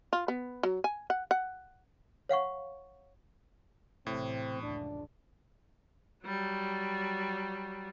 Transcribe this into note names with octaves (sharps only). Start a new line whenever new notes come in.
F4
B3
F#3
G#5
F#5
F#5
C#5 F5 F#5 C#6
A1 A2 C3 C4
F1 C#2 D4
F#3 G3